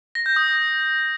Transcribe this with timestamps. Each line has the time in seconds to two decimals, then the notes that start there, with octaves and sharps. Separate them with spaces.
0.15 A#6
0.26 G6
0.36 D#6